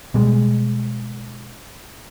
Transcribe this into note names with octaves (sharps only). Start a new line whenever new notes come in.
B2 G3 G#3